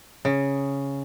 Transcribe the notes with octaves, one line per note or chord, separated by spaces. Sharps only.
C#3